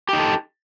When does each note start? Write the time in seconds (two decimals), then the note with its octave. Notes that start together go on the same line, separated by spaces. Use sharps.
0.09 G4
0.13 D#4
0.18 A4